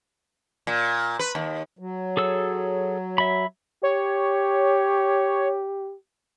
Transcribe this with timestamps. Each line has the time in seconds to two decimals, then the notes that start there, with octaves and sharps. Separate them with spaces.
0.67 A#2
1.19 B4
1.35 D#2
1.79 F#3
2.17 G#4 A4 E6
3.18 E5 B5
3.83 G4 C#5